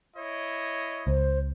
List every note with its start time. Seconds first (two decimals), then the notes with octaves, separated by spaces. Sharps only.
0.15 E4 C#5 D#5
1.07 C#2 C5